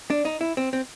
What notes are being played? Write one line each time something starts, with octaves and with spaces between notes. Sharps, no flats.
D4
D#4
E4
C4
C4